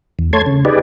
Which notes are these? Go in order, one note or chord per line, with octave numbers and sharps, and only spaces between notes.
E2
A3 C#5 A5 C6 G#6
C#3
D#4 G4 G#4 B4 D5